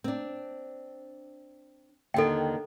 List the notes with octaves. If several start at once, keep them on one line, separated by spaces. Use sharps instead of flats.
C4 D4
D#2 D3 D#3 A4 G5